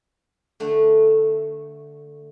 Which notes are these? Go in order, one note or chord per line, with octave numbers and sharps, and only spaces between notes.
D3 A3